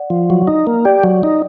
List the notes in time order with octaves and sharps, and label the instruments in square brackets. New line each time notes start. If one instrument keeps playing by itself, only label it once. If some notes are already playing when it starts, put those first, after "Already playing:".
Already playing: [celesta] D5 F#5
[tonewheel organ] F3
F#3
D#4
A#3
[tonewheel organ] G4 [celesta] D5
[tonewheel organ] F#3
D#4